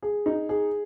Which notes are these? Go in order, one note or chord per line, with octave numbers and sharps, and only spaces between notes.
G#4
D#4
G#4